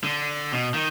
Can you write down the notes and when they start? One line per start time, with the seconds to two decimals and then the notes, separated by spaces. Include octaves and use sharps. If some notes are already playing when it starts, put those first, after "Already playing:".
0.04 D3
0.52 B2
0.74 D#3